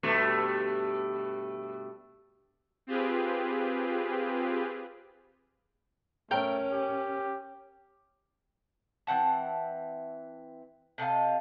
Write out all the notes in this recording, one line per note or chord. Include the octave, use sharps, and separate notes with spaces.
G2 B2 A3
C4 F4 G4 G#4 B4
A3 C#4 A#4 G5
G4
E3 C4 F#5 A5
C3 A4 D#5 F5